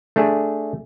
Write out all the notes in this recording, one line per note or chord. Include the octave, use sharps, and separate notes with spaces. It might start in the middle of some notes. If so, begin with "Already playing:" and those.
A3 D4 G#4